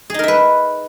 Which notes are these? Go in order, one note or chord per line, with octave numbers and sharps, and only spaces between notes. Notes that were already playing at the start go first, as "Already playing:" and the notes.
D#4 G#4 A#4 B4 E5